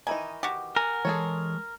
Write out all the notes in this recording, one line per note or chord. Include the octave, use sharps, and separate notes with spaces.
D#3 E3 D#4 G#5
F#4 G4
A#4 F#5 G#5
E3 G#3 G#4 A4 C#5